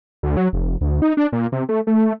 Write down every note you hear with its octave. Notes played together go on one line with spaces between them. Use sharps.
D2
F#3
F1
D2
D#4
D4
A#2
C3
A3
A3